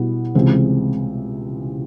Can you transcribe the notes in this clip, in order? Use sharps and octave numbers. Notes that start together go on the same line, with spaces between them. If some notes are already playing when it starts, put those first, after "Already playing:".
Already playing: B2 G3 B3 E4
C#2 C3 E3 G#3 C4